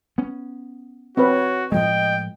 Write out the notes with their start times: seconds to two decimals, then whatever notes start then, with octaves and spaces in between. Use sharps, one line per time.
0.18 B3 C#4
1.17 C4 F#4 B4 C#5
1.72 A2 F3 G#3 D#5 G5